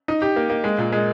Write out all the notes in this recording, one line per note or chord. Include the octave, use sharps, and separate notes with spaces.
D#4
G4
A#3
A#3
G#3
A#2
G#3